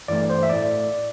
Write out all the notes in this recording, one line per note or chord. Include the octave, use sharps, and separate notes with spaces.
G2 E3 A3 D5
C5
E5
A2 A3 D5